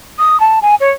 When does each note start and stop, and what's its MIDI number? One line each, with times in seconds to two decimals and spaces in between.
0.18 0.40 87
0.40 0.59 81
0.62 0.75 80
0.80 0.91 73